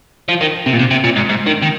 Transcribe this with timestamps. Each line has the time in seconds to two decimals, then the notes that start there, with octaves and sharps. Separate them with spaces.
0.29 F3
0.41 D#3
0.66 C3
0.73 A#2
0.79 C3
0.91 C3
1.04 A#2
1.16 G#2
1.29 G#2
1.46 D#3
1.62 D#3